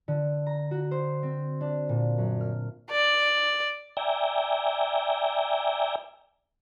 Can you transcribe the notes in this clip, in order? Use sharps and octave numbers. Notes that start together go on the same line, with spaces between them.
D3
A#5
F#4
C5
C4
D4
A#2
F#2
F6
D5
D5 E5 G5 G#5 A#5